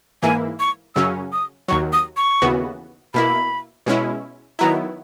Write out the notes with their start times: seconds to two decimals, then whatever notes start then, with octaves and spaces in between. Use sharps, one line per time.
0.22 G#2 E3 A#3 E4 G#5
0.60 C#6
0.95 F#2 C#3 F#3 C#4 E6
1.32 D#6
1.68 D#2 D#3 F#3 C#6
1.93 D#6
2.17 C#6
2.42 D#2 C#3 E3 B3 F#4
3.14 B2 A#3 E4 B5
3.86 B2 G#3 C#4 E4
4.59 D#3 F#3 B3 E4 A#5